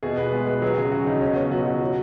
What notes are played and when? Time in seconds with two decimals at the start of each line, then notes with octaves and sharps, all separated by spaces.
0.03 B2 G#4
0.17 B2 B4
0.32 G#3 G#4
0.47 G#3 B4
0.62 F#3 G#4
0.77 C#3
0.92 C#3 F#4
1.07 C#3 D#4
1.21 B2 C#4
1.36 B2 C#4
1.51 F#3 F#4
1.66 F#3
1.80 F#3